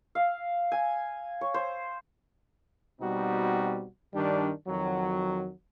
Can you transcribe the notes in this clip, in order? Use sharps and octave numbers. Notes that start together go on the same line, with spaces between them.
F5
G#5
C#5
C5
B2 G3 C4 D#4 F#4
G2 D#3 G3 D4
F2 D#3 F#3